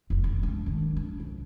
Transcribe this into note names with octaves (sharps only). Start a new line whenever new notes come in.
F1 D#2
D3
D4
D#3 D4
D4
C2